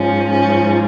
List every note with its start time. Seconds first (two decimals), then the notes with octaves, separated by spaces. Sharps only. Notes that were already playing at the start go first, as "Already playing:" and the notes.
Already playing: G#2 F3 C#4
0.29 C#4